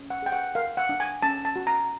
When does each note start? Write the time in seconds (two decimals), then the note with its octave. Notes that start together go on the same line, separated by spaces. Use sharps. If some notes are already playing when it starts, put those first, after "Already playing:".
Already playing: C#4
0.10 F#5
0.22 G#4 G5
0.32 F#5
0.55 A#4 F5
0.77 F#5
0.89 D4
1.00 G#5
1.22 C#4 A5
1.45 A5
1.56 F#4
1.67 A#5